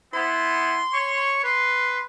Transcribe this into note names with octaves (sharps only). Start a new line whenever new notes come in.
B3 E4 C6
C#5 C#6
B4 C6